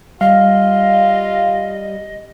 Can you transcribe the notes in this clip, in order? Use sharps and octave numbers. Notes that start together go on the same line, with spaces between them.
G3 F4 D#5 F5